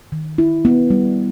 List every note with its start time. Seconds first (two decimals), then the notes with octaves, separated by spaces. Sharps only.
0.12 D#3
0.38 E4
0.65 B3
0.90 G3